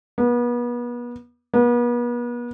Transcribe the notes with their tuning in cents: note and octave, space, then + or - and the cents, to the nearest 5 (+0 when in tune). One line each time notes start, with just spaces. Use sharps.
B3 -35
B3 -40